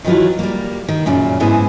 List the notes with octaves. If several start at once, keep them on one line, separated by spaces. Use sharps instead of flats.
D#3 E3 F#3 E4 F4
G3 A#3
D#3
F#2 A#2 C#3
G#2 B3 E4 G#4